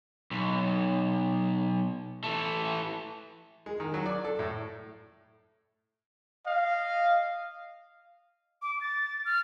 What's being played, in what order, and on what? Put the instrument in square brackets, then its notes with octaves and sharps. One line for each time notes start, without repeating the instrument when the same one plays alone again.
[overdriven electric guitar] B1
E3 A3
[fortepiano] G#3
D#3
F#3
D5
A4
A2
[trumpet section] D#5 F5
[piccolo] D6
A6
F6